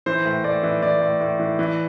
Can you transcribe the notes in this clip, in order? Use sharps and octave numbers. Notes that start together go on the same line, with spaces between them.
E3 C5
A2
A2 D5
E3
E3 D5
A2
A2
E3
E3